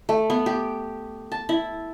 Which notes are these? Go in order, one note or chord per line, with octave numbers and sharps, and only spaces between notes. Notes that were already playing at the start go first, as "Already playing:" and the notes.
A3
B3
G4
A5
E4